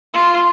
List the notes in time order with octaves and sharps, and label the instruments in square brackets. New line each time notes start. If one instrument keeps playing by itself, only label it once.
[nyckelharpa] F4